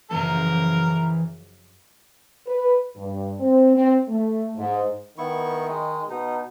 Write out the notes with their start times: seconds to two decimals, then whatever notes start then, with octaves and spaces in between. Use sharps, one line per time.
0.11 F#2 C#3 E3 F3 A#4 A#5
2.46 B4
2.95 G2
3.39 C4
3.74 C4
4.08 A3
4.56 G#2
5.18 D#3 B3 E4 C#6
5.68 G#3
6.09 B2 D#4